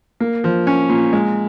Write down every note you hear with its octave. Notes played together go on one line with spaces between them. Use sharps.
A#3
F3
C#4
A#2
G#3